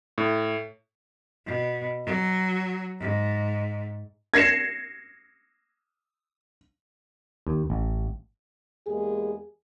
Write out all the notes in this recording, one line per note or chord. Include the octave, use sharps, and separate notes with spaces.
A2
B2
F#3
G#2
G#6 A#6 C7 C#7 E7
D#2
A1
E2 G#3 A#3 G4 G#4